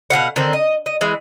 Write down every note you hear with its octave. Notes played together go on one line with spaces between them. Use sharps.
B2 F#3 F5 F#5
D3 D#3 C4
D#5
D#5
E3 G#3